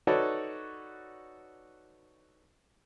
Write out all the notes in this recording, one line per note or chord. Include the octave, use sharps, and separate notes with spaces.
D#4 F#4 A4 B4 C#5 D5